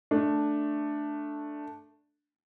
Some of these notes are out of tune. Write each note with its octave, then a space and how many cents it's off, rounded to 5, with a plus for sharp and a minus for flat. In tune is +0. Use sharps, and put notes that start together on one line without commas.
A3 +0 D4 +5